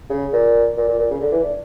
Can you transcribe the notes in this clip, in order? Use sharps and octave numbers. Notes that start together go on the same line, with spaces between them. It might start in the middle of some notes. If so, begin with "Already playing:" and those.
C#3
A#2
A#2
A#2
A#2
C#3
D3
E3
D4